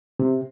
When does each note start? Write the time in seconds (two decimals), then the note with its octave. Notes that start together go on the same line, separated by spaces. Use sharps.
0.19 C3